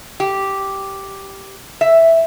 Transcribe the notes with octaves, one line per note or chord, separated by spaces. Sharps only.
G4
E5